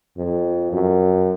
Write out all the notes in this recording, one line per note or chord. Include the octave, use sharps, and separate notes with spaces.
F2
F#2